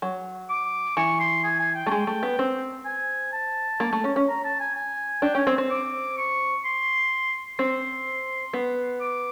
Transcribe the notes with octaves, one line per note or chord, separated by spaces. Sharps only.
F#3
D6
E3 C#6
C6
G#5
G#5
G5
A3
G#3
A3
B3
C4
G#5
A5
A#3
A3
C#4
C#4
A#5
A5
G#5
G#5
D4 G5
C#4 G5 G#5
C4
C4
D6
C#6
C6
C4 C6
B3
D6